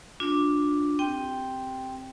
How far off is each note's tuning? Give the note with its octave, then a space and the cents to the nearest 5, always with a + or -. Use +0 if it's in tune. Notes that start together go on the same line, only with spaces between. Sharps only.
D4 +0 F4 +35
C4 +0 G4 +0 G5 +0